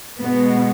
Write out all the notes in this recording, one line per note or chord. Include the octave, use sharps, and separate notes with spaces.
B2 G#3 B3